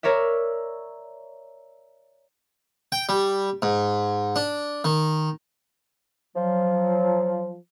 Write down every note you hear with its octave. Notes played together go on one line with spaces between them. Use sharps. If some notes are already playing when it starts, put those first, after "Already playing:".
A#4 C#5 D5 E5
G5
G3
G#2
D4
D#3
F3 F#3